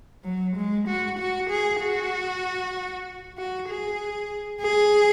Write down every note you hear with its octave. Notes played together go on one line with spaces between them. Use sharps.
F#3
G#3
F#4
F#4
G#4
F#4
F#4
G#4
G#4